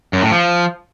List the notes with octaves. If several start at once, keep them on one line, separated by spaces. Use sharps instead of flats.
F#2
A2
F3